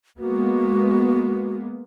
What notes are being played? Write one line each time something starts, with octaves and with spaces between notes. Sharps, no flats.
G#3 A#3 B3 F#4